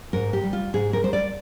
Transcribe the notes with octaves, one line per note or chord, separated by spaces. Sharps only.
G#2 A#4
G4
G3
F4
G#2 G#4
A#4
G3 C5
D5